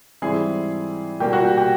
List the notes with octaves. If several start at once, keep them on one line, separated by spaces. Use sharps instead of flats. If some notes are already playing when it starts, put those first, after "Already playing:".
G#2 E3 G3 C4 E4 G#4
B2 G3 A#3 G4
F#4
G4
G4